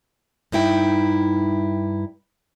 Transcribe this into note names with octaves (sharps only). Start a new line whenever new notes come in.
G2 D#4 E4 G5